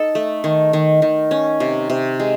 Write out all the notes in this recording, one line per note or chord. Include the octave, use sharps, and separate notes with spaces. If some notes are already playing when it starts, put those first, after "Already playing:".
Already playing: D#4 A4
A3
D#3
D#3
D#3
C#4
C3
C3
G#3